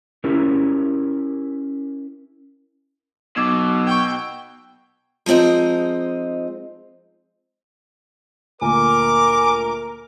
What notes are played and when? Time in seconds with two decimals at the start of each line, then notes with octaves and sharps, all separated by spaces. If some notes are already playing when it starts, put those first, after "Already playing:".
0.24 C#4 E4 G4 A#4
3.37 B1 B2 D6 E6 G#6
3.87 G5 C#6 E6 G#6
5.26 F3 G#3 C4 D#4 D#5
8.61 D2 A#2 A#4 G#5 D6